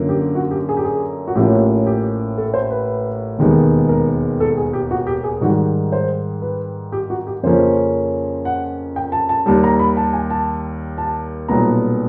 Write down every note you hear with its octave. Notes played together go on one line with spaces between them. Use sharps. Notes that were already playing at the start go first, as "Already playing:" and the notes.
Already playing: F#2 D3 F3 A#3
G4
F#4
G4
G#4
G4
G#4
F#4
A1 A2 F3 A#3 C#4 G4
G4
A4
C5
B4
E1 D#2 D#3 G#3 B3
A#4
A4
G#4
G4
F#4
G4
G#4
G#2 D#3 G3 F#4
C5
B4
G4
F#4
G4
F2 C#3 F3 A#3 C#4 C5
F#5
G5
A5
A5
D#2 D#3 G3 A5
A#5
B5
A5
G#5
A5
A5
B1 A#2 G3 B3 A#5